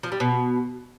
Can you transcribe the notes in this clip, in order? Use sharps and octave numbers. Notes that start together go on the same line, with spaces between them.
F3
G3
B2